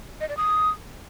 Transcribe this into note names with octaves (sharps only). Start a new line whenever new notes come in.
D#5
D5
D#6